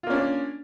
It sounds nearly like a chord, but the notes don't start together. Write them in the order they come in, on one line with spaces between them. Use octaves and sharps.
F4 A#3 C#4 D4